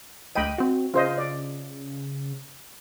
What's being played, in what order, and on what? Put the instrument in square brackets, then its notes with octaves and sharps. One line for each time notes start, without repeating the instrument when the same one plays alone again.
[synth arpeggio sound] D2 D#7 [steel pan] D#5 G5 B5
[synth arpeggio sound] C4 F#4
[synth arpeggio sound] C#3 [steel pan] F4 C5 D#5
[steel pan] D5